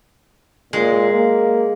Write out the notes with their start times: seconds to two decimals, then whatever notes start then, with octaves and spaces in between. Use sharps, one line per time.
0.73 A#2 G#3
1.12 A#3